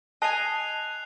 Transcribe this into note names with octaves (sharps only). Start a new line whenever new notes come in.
D#5 G#5 A5 F#6 C7 F7